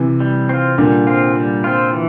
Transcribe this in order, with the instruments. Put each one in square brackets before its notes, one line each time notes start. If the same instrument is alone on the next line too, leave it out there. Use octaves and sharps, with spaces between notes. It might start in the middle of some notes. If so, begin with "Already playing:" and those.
Already playing: [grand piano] C3 E3
[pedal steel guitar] G3
C4 F4
[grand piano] A#2 D3 [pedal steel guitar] G3
[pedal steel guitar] C4 F4
G3
C4 F4
E3